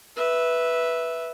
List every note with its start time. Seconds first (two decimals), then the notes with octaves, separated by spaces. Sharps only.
0.16 B4 E5